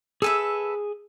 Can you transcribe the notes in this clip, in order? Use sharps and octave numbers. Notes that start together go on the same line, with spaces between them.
G#4 A4 B4 E5 G#5